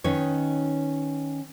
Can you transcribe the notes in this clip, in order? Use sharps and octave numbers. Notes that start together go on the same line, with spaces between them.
D#3 C#4 D#4 B4 C#5